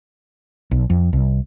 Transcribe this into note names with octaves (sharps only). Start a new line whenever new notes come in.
B1
F2
C2